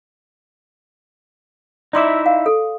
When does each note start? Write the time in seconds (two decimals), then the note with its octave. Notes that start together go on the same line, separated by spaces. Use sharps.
1.93 D#4 E4 D5 E5 C6 D6
2.26 F5
2.46 A4